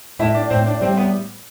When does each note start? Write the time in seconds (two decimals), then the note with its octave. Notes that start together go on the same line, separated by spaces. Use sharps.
0.19 A2 E4 E5
0.35 D4 D5
0.50 A2 C4 C5
0.66 D4 D5
0.81 G3 C4 C5
0.97 B3 B4